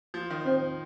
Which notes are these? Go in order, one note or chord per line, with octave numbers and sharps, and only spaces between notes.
F3
D#3
D#3 C4